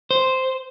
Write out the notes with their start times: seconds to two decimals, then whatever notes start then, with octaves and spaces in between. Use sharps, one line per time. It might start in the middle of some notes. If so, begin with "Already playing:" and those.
0.11 C5